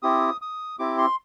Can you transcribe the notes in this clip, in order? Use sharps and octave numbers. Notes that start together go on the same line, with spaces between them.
C4 E4 G4 D#6
D#6
C4 E4 G4 D6
C6